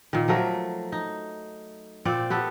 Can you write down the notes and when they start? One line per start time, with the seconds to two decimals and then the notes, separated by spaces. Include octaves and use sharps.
0.13 A#2 D#3
0.28 F3 F#3 A3 A#4
0.92 D#4
2.05 A#2 C4 D5
2.30 B3 G4 A4